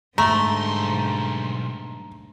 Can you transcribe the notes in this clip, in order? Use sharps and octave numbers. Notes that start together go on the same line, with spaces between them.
B1 G#2 D3 G3 A3 A#5 C6